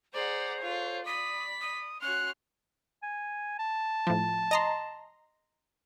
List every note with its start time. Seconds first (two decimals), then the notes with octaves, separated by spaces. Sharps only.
0.14 G#4 C5 D5 F#5 A#5
0.62 F4 A4 C#5
1.06 D5 B5 D#6 B6
1.61 D#6
2.02 C#4 F#4 C6 F6 F#6
3.03 G#5
3.59 A5
4.07 A2 F3
4.51 D#5 A#5 C6